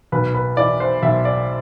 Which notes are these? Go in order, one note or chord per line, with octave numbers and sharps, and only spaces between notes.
B1 B4
B4
E3 D5
C5
B1 E5
D5